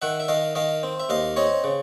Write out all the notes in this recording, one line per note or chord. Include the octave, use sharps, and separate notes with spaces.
D#3 E5 F#5
E5
D#3 D#5 F5
D#3 D#5 F5
C4
E5
D#2 D#5 F5
C4 C#5 D#5
C#3